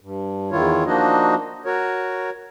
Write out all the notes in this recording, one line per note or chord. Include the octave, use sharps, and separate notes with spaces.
G2
E2 D#3 E4 F4 C#5
F3 A#3 D4 D#4 F#4 D#5
F#4 A#4 C#5